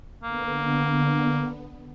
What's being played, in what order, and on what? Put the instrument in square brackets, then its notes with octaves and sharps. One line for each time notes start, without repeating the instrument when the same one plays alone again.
[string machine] D3 B3 [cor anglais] A#3